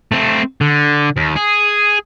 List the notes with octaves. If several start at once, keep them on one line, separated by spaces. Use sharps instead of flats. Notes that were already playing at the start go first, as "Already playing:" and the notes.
A3 C4
D3
D#2
G#4